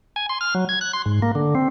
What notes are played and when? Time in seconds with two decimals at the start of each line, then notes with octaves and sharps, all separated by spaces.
0.16 G#5
0.29 C6
0.41 F6
0.55 F#3
0.69 G#6
0.81 F#6
0.93 C6
1.06 G#2
1.22 A#3
1.35 D3
1.55 C4